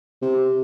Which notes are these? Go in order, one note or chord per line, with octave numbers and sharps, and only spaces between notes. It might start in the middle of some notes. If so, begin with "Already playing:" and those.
C3